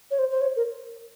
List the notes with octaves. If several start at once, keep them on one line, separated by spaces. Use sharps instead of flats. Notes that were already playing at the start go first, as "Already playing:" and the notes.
C#5
C5
C5
C#5
A#4